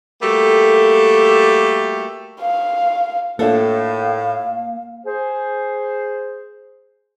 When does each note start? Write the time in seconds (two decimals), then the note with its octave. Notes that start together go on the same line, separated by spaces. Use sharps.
0.22 G3 A3 A#3 F#4 G4 A4
2.41 F5
3.39 A2 A#3 D4 F4 A4 F5
5.06 G#4 C5